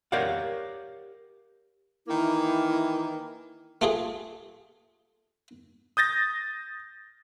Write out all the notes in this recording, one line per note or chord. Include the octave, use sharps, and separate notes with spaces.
G4 A#4 C#5 D5 F5 F#5
D#3 E3 A#3 E4
A3 F4 G4 G#4
D#6 G6 A6 A#6